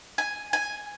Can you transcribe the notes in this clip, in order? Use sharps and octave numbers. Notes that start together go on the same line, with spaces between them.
G#5
G#5